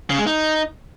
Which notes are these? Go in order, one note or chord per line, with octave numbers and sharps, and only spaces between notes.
C#3
G#3
D#4